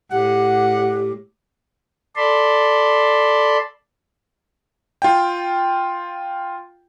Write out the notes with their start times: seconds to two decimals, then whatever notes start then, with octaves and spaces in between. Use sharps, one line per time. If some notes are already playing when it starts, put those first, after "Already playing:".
0.12 A2 G4 F#5
2.16 A4 D5 A5 B5 C6
5.02 F4 G5